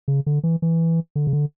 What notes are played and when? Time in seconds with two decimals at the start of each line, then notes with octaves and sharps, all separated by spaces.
0.08 C#3
0.26 D3
0.44 E3
0.62 E3
1.16 D3
1.27 C#3
1.33 D3